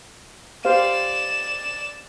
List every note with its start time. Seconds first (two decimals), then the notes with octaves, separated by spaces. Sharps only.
0.65 G4 C5 D5 F5 E7